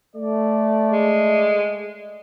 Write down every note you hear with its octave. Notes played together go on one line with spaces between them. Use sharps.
A3 D5
G#3